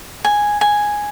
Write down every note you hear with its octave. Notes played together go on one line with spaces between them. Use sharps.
G#5
G#5